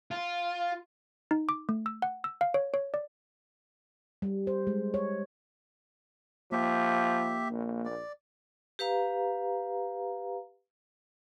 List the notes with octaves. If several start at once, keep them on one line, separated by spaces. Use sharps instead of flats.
F4
D#4
D6
A3
E6
F#5
E6
F5
C#5
C#5
D5
G3
C5
G#3
C#5
F3 A#3 G4 E5
A#1
D5
G4 B4 F5 A#5